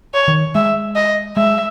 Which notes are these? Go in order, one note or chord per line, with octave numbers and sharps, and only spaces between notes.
C#5
D#3
G#3 E5
D#5
G#3 E5